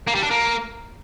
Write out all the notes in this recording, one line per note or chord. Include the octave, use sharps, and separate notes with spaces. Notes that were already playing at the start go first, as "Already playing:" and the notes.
A#3
G3
D4
A#3